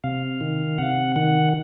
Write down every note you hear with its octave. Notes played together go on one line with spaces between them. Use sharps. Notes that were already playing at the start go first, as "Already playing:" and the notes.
C3 F5
D#3
C3 F#5
D#3 F#5